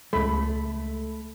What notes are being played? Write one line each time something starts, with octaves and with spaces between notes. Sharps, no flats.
C#2 A3 B5